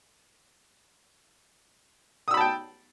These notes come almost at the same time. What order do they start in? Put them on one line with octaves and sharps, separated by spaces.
D#6 E6 B5 A5 G5